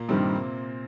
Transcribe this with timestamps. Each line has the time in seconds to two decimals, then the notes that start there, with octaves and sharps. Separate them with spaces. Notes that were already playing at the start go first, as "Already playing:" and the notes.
Already playing: A#2 A#3
0.09 G2 C3 D#3 G3 C4